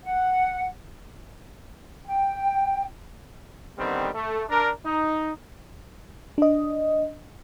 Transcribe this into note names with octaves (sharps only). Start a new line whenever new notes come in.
F#5
G5
D3 D#3 G3 B3 C4
A3
D4 A#4
D#4
D4 D#5